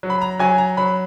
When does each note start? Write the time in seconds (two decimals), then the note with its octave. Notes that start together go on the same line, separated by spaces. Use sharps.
0.03 F#3
0.10 B5
0.22 A#5
0.39 F#3 G#5
0.58 A#5
0.77 F#3 B5